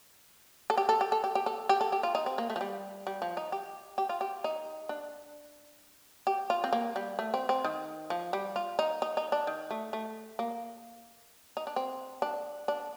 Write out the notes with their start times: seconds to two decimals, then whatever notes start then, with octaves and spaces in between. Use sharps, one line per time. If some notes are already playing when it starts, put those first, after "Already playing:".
0.70 A4
0.77 G4
0.89 A4
1.01 G4
1.12 A4
1.24 G4
1.35 G4
1.46 A4
1.69 G4
1.81 A4
1.92 G4
2.03 F4
2.15 D#4
2.26 C4
2.38 A#3
2.50 A3
2.56 F3
2.61 G3
3.07 G3
3.22 F3
3.37 D#4
3.52 G4
3.98 G4
4.09 F4
4.21 G4
4.44 D#4
4.89 D4
6.27 G4
6.50 F4
6.64 C4
6.73 A#3
6.96 G3
7.19 A3
7.34 C4
7.49 C4
7.65 D#3
8.10 F3
8.33 G3
8.56 F4
8.79 D#4
9.02 D#4
9.17 D#4
9.32 D4
9.47 D#3
9.71 A3
9.93 A3
10.39 A#3
11.57 D#4
11.67 D4
11.76 C4
12.22 D4
12.68 D4